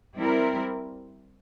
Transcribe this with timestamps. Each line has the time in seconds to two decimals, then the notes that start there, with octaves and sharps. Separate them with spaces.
0.16 G3 C4 E4 A#4